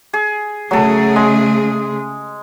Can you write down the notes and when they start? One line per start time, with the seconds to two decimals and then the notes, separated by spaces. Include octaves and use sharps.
0.13 G#4
0.71 C#3 F#3 A3 G#4 A4
1.16 G#3